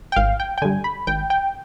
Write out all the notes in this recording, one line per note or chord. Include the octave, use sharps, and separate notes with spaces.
G5
G#1 F5
G5
G5
G2 D3 G#5
B5
G#1 G5
G5